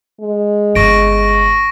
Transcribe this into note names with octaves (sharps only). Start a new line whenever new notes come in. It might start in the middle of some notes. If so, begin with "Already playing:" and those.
G#3
G1 D3 C#6 A#6 D7